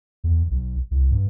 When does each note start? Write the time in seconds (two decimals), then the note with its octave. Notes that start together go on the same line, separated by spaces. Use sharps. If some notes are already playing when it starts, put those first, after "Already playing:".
0.24 E2
0.51 B1
0.91 C2
1.11 G2